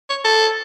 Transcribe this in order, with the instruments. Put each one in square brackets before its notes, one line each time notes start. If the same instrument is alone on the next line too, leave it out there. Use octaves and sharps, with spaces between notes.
[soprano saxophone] C#5
A4